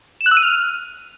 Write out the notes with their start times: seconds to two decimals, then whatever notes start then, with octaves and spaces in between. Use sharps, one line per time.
0.21 E7
0.26 F#6
0.31 E6
0.37 D#7
0.42 F6